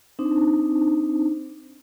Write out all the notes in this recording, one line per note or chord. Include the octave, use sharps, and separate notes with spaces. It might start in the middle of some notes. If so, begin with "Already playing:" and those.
C4 D4 D#4 C5